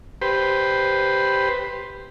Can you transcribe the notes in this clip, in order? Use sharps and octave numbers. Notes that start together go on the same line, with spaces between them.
G4 B4 C5